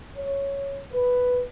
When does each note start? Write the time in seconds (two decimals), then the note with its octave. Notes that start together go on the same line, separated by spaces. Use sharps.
0.17 C#5
0.92 B4